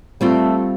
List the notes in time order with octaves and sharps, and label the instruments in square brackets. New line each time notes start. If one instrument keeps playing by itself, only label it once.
[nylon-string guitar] G3 C4 F4 [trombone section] A3